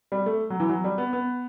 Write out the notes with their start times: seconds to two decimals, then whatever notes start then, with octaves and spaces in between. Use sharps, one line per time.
0.12 G3
0.26 A3
0.50 F#3
0.60 E3
0.70 F#3
0.84 G3
0.98 B3
1.13 B3